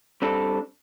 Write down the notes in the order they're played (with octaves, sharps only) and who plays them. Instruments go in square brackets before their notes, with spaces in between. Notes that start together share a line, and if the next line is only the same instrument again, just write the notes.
[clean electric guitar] G3 C4 D4 A4